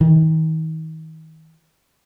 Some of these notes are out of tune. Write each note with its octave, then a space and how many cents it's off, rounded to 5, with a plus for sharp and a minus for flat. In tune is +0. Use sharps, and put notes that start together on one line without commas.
D#3 +40